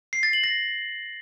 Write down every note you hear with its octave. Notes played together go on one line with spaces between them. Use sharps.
C7
A6
F#7
A#6